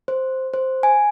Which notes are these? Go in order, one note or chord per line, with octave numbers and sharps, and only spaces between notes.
C5
C5
G#5